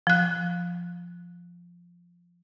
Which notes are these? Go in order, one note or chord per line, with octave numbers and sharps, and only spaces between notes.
F3 F#6